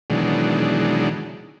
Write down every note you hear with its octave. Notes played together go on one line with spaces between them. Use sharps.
B2 D#3 E3 F#3 G#3 D4